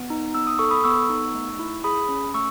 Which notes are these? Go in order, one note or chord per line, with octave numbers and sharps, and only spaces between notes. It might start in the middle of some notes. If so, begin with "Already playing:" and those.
Already playing: B3
D#4
B3 E6
D#6
A4 C#6
B5 D#6
B3 C#6 E6
D#4
A3
E4
G#4 B5 D#6
C#4
A3 C#6 E6